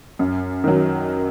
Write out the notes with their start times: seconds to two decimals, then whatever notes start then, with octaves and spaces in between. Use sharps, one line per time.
0.19 F#2
0.64 D#3 F#3